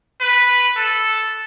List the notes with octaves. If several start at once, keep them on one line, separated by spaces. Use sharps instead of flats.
B4
A4